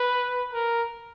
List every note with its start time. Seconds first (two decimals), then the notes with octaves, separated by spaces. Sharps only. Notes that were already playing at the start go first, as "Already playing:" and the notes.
Already playing: B4
0.53 A#4